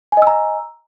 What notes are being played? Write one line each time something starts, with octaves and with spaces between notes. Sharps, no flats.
D#5 G#5 A#5 E6